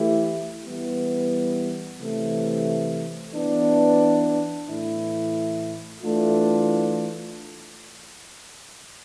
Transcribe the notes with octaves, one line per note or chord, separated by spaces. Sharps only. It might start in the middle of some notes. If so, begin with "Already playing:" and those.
Already playing: E3 A3 E4 G4
E3 G3 B3
C3 E3 A3
E3 B3 D4
A2 E3 A3 E4
E3 A3 D4 F4